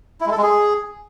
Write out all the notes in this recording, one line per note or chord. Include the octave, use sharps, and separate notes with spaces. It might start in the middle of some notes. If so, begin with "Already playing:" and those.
E4
G#3
A4
G#3
G#4